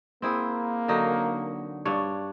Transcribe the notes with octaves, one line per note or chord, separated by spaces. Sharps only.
A#3 C4 E4 G#4
D3 F#3 D#4
G2 D4 C#5